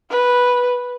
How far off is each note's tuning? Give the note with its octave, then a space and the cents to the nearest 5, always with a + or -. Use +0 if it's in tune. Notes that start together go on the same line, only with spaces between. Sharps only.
B4 -5